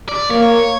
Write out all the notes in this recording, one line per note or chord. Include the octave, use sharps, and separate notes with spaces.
D5
A#3 C#5